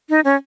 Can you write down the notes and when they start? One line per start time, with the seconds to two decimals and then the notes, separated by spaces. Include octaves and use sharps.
0.09 D#4
0.25 C#4